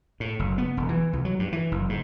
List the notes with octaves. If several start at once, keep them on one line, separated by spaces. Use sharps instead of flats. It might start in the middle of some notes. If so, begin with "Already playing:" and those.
A2
F#1
B3
E1
E3
C2
F#3
G2
E3
F#1
G#2